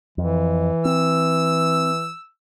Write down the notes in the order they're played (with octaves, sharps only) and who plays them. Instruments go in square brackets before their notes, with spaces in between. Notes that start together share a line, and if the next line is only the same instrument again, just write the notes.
[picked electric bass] F2 [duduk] E3
[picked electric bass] C4 [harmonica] E6